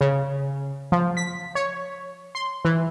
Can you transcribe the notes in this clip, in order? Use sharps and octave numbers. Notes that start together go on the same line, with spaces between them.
C#3
F3
B6
C#5
C6
E3